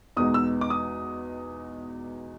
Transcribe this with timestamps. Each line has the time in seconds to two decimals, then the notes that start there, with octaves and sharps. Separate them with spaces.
0.17 E2 B2 G#3 B3 D#4 D#6
0.34 E6
0.61 D6
0.70 D#6